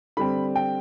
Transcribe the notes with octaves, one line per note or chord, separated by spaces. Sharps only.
D3 G3 C4 B5
G5